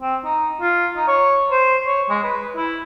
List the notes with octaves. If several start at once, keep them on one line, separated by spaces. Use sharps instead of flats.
C4
D#4
F4
D#4
C#5
C5
C#5
G#3
B4
E4